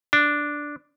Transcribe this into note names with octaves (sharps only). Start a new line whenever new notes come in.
D4